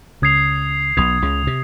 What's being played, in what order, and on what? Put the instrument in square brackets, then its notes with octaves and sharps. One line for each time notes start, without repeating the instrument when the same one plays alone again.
[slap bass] C#2 C#3 [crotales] D#6 G#6 C7 F7
[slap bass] B1 B2 [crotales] D#6 G#6 C7 F7
[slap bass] C#2 C#3
C3